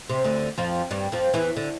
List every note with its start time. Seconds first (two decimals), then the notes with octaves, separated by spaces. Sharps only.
0.09 C3
0.24 D2 D3
0.58 F2 F3
0.91 G2 G3
1.12 F2 F3
1.34 E2 E3
1.57 D3